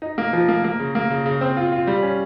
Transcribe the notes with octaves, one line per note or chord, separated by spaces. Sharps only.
D#4
A#3
F3
A#3
A#3
C#3
A#3
C#3
C#3
C4
F4
F4
G3
C#4